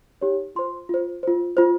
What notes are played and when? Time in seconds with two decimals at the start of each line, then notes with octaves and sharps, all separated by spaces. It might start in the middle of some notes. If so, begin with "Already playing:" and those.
0.21 D#4 G4 C#5
0.55 F4 C5 C6
0.89 F4 C5
1.23 F4 C5
1.57 F4 C5